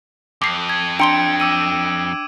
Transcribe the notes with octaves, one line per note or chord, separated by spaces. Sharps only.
F2 D6 C7
G#6
D4 G5 A#5 C6 C#7 D7 G7
D6 E6 D#7